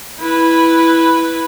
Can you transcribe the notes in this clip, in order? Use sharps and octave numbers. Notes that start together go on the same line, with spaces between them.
E4 B4